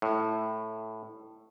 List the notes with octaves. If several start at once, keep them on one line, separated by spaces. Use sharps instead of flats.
A2